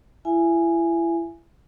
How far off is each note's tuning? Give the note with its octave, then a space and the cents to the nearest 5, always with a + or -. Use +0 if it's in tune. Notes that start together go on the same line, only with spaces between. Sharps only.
E4 +30 E5 +30 G#5 +0